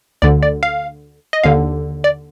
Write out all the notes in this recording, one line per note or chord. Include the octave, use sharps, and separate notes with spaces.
D2 D3 D5
D5
F5
D#5
D#2 D3 F5
D5